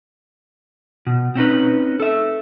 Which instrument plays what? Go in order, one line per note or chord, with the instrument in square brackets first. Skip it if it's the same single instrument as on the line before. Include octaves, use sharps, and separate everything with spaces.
[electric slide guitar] B2
C4 C#4 D#4 B4
A4 E5